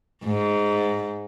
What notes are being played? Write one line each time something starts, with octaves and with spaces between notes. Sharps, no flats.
G#2